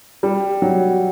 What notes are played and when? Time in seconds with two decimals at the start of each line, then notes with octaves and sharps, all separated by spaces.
0.23 G3
0.62 F#3